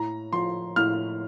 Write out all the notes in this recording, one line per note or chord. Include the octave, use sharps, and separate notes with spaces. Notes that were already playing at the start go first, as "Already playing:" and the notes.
Already playing: A2 A#5
F3 C6
A2 F6